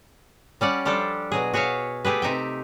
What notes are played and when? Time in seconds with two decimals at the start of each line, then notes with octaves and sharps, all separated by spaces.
0.61 G3 C#4 D5 F#5
0.85 F3 G3 D4 G4 A4
1.32 B2 F#3 G#4
1.53 F#4 G#4 C#5 E5 F5
2.05 A3 G4 G#4 B4
2.22 C3 D#4 E5 G5